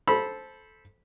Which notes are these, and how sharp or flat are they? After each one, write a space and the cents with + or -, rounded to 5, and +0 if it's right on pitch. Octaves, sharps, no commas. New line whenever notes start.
A4 -15 C5 +0 B5 -15